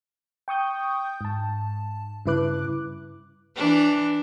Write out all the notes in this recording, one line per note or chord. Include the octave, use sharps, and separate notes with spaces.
G5 C#6 D#6 G6
G#2 A5
G2 C#3 E4 B4 D6 F#6
E3 D4